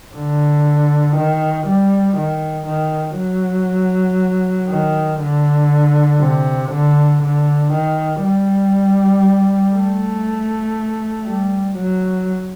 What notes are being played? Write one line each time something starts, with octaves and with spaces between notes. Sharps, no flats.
D3
D#3
G3
D#3
D#3
F#3
D#3
D3
C3
D3
D3
D#3
G3
A3
G3
F#3